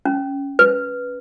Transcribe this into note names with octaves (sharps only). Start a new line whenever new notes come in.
C#4
B4